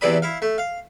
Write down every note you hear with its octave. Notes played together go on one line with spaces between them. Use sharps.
E2 C3 E3 D5 B5 D#6
E4 F5
A3
F5